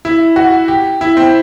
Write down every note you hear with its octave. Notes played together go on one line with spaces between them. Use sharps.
E4
F#4
G4
E4
C4